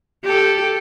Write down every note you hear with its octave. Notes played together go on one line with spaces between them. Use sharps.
G4 A4